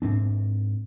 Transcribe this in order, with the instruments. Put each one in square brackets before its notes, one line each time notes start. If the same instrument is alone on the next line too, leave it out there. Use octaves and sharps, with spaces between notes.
[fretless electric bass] G#2 C4 D4